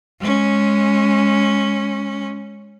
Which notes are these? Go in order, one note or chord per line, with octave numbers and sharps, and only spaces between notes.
G#3 C#4